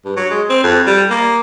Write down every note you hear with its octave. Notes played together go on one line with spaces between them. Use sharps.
G2
F#3
G#3
C4
F2
G3
A#3